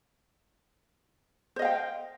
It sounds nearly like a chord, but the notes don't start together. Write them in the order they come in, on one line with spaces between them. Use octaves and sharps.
C5 D#5 F5 G5